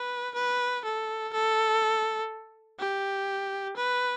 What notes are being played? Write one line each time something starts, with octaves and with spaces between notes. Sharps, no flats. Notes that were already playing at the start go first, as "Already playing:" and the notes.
Already playing: B4
B4
A4
A4
G4
B4